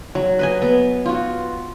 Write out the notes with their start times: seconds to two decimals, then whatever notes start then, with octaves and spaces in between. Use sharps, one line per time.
0.15 F#3
0.39 B4 D#5 G#5
0.62 B3
1.06 F4 F#4